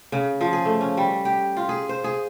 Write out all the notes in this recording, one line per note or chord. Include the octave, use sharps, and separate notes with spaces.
C#3
F3
G#4
A3
C#4
G3
G4
F4
G#4
C5
G#4